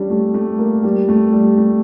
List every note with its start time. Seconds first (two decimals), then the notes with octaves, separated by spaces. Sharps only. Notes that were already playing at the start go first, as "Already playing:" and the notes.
Already playing: G3 C#4 D4
0.10 A3
0.34 A3
0.59 A#3
0.83 G3
1.09 A3
1.33 G3
1.57 A3